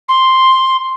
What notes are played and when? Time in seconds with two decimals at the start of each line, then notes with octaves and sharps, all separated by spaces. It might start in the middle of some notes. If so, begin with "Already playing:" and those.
0.08 C6